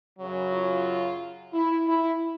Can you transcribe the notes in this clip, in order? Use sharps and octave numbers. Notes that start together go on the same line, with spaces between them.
F#2 C#3 F#3
F4
E4
E4